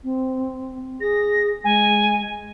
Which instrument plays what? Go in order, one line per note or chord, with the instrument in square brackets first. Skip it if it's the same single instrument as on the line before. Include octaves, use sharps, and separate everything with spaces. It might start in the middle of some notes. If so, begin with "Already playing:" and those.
[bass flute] C4
[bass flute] G#4 [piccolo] A#6
[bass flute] G#3 [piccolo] G#5